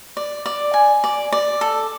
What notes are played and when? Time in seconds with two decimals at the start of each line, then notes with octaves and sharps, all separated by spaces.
0.17 D5
0.46 D5
0.74 G#5
1.04 D5
1.32 D5
1.61 A4